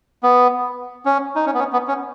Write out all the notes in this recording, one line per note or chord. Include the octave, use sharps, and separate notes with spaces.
B3
C#4
D#4
C#4
B3
C#4
B3
C#4